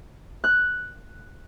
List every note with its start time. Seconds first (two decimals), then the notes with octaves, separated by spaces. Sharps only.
0.44 F#6